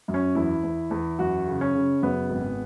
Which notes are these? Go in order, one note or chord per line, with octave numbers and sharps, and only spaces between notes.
F#2
C#4
E2 E4
E2
E2
F#2 F#4
C#3
C#4
C#3
F#2 B3
G#1